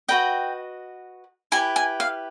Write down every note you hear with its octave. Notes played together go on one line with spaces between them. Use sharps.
F#4 B4 D#5 G5
E4 G4 B4 G#5
G#5
F5